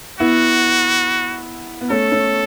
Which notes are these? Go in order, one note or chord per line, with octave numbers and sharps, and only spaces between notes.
B3 E4 F#4
B3
A3 C#4 A4
A3 C#4